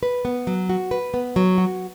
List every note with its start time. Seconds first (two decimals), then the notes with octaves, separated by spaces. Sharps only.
0.03 B4
0.25 B3
0.47 F#3
0.69 F#4
0.91 B4
1.14 B3
1.36 F#3
1.58 F#4